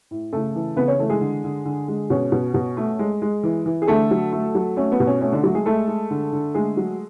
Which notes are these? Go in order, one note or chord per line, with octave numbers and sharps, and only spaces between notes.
A2
C#3 A3 A4
E3
C#3 B3 B4
C#4 C#5
E3 A3 A4
G#3 G#4
D3
D3
D3
G#3
B2 C#4
B2
B2
A3
G#3
G#3
E3
E3
G#4
D3 A3 A4
F#3
A3
F#3
A3 C#4
B3
B2
C#4
A3 C#4
D3 D4
F#3 A3 F#4
G#3 G#4
G#3 A3 A4
G#3
D3
D3
G#3 A3 G#4
F#3